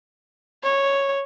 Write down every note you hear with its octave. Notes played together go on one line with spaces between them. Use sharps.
C#5